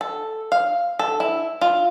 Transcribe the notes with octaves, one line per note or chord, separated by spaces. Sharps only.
A4
F5
A4
E4
F4